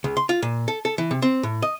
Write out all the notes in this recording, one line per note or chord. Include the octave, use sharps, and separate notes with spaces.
C#2
C6
F4
A#2
A4
A4
E3
C3
C4
A2
D#5